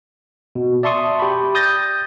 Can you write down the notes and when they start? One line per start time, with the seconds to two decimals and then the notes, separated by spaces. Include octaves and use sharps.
0.55 B2
0.83 D5 E5 A5 C6 C#6 D#6
1.20 G4 B5
1.55 D#6 G6 A6 A#6